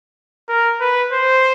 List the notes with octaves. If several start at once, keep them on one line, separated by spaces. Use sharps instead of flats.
A#4
B4
C5